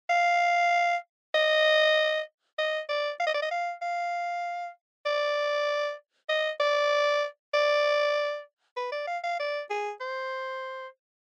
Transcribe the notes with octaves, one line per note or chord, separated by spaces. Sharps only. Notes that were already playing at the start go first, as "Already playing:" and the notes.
F5
D#5
D#5
D5
F5
D#5
D5
D#5
F5
F5
D5
D#5
D5
D5
B4
D5
F5
F5
D5
G#4
C5